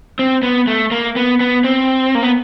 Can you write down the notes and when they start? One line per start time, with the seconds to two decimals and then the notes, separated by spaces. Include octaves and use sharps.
0.19 C4
0.43 B3
0.67 A3
0.91 A#3
1.16 B3
1.40 B3
1.64 C4
2.15 A#3
2.23 B3